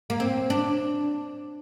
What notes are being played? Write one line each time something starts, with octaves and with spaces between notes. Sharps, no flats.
A#3
C4
D4